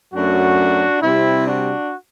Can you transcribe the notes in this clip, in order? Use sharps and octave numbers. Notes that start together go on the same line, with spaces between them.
F#2 F#3 A3 D4 F#4
C3 G3 C4 E4
D4 F#4